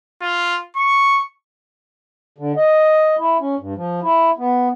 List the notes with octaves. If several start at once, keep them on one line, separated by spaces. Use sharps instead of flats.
F4
C#6
D3
D#5
E4
C#4
G2
F3
E4
B3